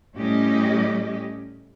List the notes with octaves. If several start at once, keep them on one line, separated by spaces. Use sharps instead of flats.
A2 G3 C#4 G4 D#5